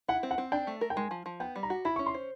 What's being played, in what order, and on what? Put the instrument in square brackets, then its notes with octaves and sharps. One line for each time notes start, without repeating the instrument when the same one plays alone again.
[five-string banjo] E4 [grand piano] F#5
[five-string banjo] C4
[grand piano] F#5
[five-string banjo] C4
[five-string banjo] D4 [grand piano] G5
[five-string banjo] A3
A#4
[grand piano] G5
[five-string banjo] G#3 [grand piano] G#5
[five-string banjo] F3
F3
[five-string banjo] B3 [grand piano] G5
[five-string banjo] G3
[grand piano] A#5
[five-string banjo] F#4
[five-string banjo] E4 [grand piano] B5
[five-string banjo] C#4 [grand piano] C#6
[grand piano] C6
[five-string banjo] C5